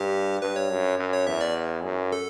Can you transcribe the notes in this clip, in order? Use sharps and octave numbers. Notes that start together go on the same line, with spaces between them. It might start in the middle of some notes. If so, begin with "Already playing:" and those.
Already playing: G2 G4
G2 B4
C#5
F#2
F#2
C#5
E2 E5
D5
F#2
A4